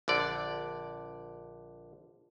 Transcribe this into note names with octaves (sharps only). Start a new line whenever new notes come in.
A#1 D3 D5